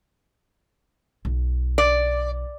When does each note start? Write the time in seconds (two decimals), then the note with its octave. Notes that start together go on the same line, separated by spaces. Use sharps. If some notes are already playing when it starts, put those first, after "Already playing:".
1.25 B1
1.78 D5